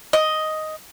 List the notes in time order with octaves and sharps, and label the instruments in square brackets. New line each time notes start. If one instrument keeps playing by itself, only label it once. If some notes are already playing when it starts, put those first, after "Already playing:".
[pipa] D#5